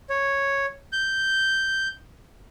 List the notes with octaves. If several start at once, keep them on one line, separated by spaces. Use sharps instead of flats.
C#5
G6